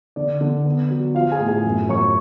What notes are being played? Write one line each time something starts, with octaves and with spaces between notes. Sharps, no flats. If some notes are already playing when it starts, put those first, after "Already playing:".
D3 D5
D3
B3
F#3
F3 F4 F5
G#4 G#5
A2
G#4 G#5
F#2
F#2 C#5 C#6